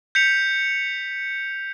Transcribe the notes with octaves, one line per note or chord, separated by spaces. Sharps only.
G6 B6 C#7 F7